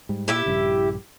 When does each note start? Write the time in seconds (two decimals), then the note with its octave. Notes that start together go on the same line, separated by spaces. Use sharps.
0.09 G#2 G3
0.28 A#2 E4 G4 E5
0.46 A#1 G2 C#3